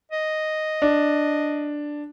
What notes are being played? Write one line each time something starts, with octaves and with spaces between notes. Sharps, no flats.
D#5
D4